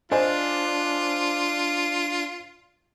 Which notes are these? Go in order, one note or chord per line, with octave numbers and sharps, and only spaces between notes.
D4 F4 C5 D#5 G#5